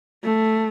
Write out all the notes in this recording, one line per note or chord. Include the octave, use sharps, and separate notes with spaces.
A3